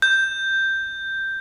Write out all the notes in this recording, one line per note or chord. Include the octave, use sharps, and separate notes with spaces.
G6